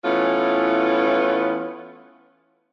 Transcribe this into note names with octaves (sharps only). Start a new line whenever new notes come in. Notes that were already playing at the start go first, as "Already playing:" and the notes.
E3 A3 B3 C#4 E4 F4